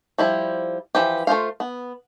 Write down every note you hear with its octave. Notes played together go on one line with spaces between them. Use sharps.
F3 G3 E4
E3 F3 G4
A3 F4 C5 F5
B3